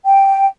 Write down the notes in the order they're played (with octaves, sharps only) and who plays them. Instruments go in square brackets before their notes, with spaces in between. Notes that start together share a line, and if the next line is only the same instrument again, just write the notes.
[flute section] G5